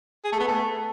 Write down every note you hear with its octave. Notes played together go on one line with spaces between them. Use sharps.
G#4
A3
B3
A3